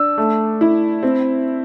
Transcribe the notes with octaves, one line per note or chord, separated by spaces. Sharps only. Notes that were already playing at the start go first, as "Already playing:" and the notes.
Already playing: D4 E6
A3
E4
C4